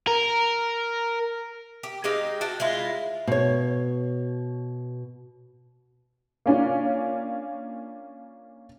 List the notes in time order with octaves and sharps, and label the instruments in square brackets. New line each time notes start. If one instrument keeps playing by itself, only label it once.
[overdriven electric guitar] A#4
[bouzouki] G4
G#3 D#4 G4 F5
F#4 G5 A5
G#3 E4 F4
[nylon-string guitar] B2 C#5
[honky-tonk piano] A#3 C#4 D4 F4